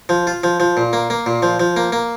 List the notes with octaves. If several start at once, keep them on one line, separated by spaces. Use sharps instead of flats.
F3
F4
F3
F3
A#2
A#3
A#3
A#2
F3
F3
A#3
A#3